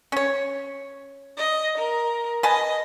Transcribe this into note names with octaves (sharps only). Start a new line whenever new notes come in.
C#4 C#5
D#5
A#4
B4 D#5 G#5 A5